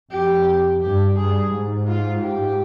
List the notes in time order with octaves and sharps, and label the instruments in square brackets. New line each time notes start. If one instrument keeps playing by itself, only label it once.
[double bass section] F2 [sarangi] G4
[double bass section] G2 [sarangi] G4
[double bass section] G2 [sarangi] G#4
[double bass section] G#2
[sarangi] F4
G4